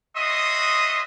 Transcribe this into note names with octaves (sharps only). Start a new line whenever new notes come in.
C#4 F#4 D#5 E5 C6 D#6